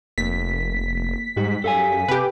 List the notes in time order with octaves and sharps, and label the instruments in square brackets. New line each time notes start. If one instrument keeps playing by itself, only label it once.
[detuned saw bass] F1 [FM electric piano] A#3 [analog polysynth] B6
[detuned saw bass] G#2 [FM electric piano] G3 G4
[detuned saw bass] F#2 [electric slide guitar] A4 F5 G#5
[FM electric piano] C3 [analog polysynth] G4 B4